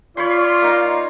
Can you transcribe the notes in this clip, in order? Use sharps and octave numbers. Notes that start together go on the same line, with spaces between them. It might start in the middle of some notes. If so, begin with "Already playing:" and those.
F4 C#5 D5 B5 C6
A#3 D#4